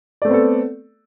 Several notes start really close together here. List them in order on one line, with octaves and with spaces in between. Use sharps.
D5 A3 C4 B3 A4